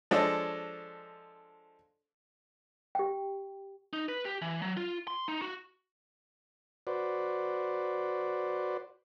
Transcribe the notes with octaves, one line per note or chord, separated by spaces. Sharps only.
F3 G#3 D4 A4 C#5 D#5
G4 G5
D#4
B4
G4
E3
F#3
F4
C6
D#4
F#4
F#4 B4 C5 D5